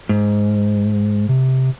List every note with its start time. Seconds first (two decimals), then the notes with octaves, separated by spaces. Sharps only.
0.09 G#2
1.29 C3